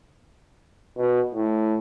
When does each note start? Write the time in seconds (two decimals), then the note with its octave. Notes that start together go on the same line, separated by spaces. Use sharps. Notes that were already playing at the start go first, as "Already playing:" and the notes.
0.98 B2
1.34 A2